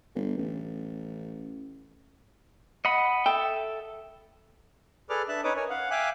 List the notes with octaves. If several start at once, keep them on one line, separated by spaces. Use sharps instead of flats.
G1
A1
D#5 F#5 B5
A4 E5 G5
G#4 A4 B4 D5 D6 F6
D4 E5 A5 F#6
C#4 D#4 B4 C#5 D6 D#6
A#4 C#5 G#5
F5 F#5
E5 F5 G5 G#5 D6 F#6